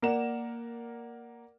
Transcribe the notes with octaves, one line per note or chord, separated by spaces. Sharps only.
A#3 A#4 D5 F#5 E7